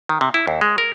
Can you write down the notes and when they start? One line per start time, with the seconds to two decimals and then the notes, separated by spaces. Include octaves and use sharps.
0.09 D#3
0.21 C3
0.34 E4
0.47 D#2
0.61 G#3
0.78 A#4